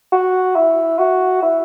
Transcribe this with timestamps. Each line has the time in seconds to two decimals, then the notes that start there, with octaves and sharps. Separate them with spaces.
0.12 F#4
0.56 E4
0.99 F#4
1.42 E4